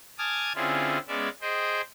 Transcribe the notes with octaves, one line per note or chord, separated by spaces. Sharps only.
G#5 A5 D6 D#6 F6 G#6
D3 C4 C#4 E4 F4 G#4
G#3 B3 C#4 D5 E5
G#4 C5 D#5 G5